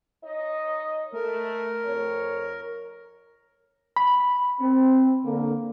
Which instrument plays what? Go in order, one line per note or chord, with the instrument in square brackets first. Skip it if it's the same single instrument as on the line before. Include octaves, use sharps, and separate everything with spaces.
[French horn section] D#4 C#5 D#5
[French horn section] A3 [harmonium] A#4
[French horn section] F2 C#5
[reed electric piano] B5
[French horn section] C4
D3 A#3